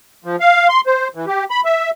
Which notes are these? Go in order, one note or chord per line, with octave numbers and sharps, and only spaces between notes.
F3
F5
C6
C5
E3
G4
B5
E5